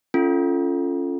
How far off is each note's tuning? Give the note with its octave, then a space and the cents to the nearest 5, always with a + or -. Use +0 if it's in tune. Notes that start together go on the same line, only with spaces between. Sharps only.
C#4 +0 F4 -15 A4 +0